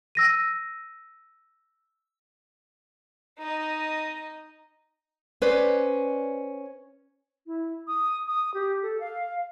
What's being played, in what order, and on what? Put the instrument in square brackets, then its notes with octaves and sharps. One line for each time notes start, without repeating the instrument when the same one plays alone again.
[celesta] E6 A#6 D#7
[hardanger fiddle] D#4 D#5
[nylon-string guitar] C#4 B4 C5 D5
[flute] E4
D#6
D#6
G4
A4
F5